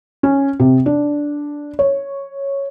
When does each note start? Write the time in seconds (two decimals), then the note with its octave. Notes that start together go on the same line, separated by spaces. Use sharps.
0.23 C#4
0.60 C3
0.86 D4
1.79 C#5